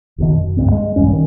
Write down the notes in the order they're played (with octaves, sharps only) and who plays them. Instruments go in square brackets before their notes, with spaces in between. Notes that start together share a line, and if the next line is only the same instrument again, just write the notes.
[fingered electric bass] F#1 D#2 B2 D#3
F#2
D2 G2 G#3 C4
G#3
A#1 E2 G2 C#4
D#3